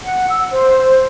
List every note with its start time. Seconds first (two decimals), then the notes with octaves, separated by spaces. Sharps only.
0.03 F#5
0.28 E6
0.52 C5